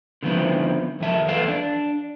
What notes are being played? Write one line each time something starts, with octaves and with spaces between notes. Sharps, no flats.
D3 D#3 F3 B3 C4 E4
F2 D#3 E5 A5
E2 E3 A4 B4 F5
D4